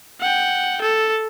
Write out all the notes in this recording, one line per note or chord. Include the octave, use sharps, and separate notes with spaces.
F#5 G5
A4